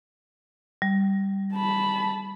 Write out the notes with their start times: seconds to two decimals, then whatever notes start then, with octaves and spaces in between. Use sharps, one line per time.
0.82 G3
1.54 A5 B5